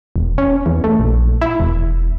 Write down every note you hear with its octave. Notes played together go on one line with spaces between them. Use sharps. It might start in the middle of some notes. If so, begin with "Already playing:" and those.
E1
C#4
E2
A3
A#1
E4
E1